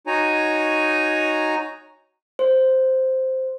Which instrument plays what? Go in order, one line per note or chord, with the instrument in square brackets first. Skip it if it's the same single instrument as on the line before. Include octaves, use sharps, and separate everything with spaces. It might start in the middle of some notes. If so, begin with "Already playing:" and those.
[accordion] D#4 F#4 C#5 G#5 A#5
[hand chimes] C5